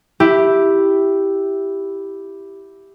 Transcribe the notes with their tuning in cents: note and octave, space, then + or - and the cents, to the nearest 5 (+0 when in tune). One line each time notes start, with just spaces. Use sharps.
E4 +0 G4 +0